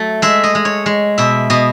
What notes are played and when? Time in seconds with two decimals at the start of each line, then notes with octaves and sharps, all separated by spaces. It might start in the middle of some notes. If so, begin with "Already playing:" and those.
Already playing: F#3 A3
0.22 G#3 E5
0.44 D#5
0.55 G#3
0.65 C#5
0.86 G#3
1.18 B2 E5
1.50 B2 D#5